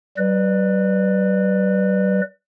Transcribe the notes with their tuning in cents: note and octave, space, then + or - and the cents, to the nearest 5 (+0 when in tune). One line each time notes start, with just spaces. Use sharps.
G3 -45 B4 +0 D5 +35